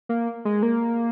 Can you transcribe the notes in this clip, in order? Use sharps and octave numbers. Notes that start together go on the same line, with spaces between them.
A#3
G#3
A#3